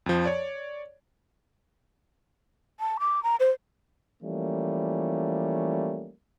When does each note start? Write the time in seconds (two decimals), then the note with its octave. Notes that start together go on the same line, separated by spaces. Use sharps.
0.06 F2 F3
0.25 C#5 D5
2.80 A5
3.00 D6
3.23 A#5
3.40 C5
4.23 E3 F3 G3 A3 A#3 C#4